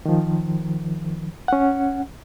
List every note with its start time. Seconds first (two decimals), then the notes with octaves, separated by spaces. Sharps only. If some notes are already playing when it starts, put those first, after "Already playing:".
0.06 D#3 F3
1.48 C#4 F#5